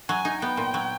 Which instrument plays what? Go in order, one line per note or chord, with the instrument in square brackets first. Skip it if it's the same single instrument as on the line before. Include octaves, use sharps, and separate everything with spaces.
[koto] F#3 [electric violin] G#5
[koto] D#4
[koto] B3 [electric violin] G5
[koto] A#2
F#3